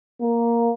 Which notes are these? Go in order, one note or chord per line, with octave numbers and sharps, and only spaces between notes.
A#3